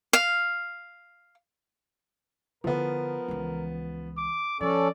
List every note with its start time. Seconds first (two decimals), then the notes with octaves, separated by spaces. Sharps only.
0.13 F5
2.64 D3 F3 B3 E4 A#4
3.28 C#2 E3
4.17 D6
4.61 F3 C#4 A4 D5